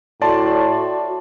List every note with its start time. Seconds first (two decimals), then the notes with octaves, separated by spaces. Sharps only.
0.22 A2 F#4 D5 A5 C6